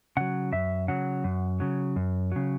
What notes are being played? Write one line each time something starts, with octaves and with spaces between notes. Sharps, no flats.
C#3 F#3 F#5
F#2 E5
C#3 F#3 F#5
F#2
C#3 F#3
F#2
C#3 F#3